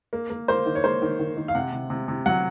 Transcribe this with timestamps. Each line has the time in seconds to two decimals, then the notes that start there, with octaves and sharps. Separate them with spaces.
0.13 A#3
0.30 A#3
0.48 A#3 C5
0.66 D#3
0.75 C#5
0.84 A#3 C5
1.02 D#3
1.19 D#3
1.37 D#3
1.48 F5
1.55 C3 F#5
1.73 C3
1.90 C3
2.08 C3
2.26 F#3 F#5